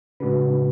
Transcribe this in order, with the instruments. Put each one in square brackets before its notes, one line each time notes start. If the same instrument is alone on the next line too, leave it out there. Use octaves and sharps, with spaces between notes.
[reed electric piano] A2 G#3 D4 F#4 B4 [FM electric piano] C#3